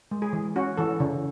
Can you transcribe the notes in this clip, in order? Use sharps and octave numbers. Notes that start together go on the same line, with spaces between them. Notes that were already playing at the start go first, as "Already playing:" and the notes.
G#3
G#4
E3
C#4 F#4
E3 A4
C#3